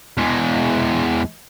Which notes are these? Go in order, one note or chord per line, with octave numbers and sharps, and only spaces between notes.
E2 G#3